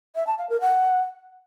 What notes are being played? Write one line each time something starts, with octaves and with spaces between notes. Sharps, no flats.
E5
A5
F5
A#4
F#5